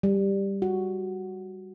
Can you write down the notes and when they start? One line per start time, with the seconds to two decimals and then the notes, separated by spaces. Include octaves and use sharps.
0.03 G3
0.62 F#4